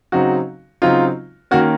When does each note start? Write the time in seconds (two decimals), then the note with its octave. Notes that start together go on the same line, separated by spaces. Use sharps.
0.12 C#3 F#3 C4 D#4 F#4
0.82 C#3 F#3 C4 D#4 F4
1.51 D#3 A#3 C#4 F#4